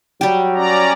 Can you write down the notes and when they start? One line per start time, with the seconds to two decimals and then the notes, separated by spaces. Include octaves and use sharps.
0.21 F#3 G3 G4
0.56 C#4 D5 A#5